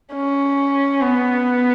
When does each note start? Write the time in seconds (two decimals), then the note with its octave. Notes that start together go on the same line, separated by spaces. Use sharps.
0.14 C#4
1.01 B3